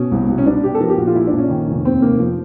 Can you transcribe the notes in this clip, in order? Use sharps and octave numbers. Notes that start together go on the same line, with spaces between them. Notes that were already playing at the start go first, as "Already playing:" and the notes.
Already playing: B2 C#4
C2
C2
C#4
B2 D4
B2 G4
A4
F3 A#4
G4
A#1 F#4
F4
A#2 E4
D4
A#1 C#4
D#3
F1
D#2 C4
F1 A#3
F3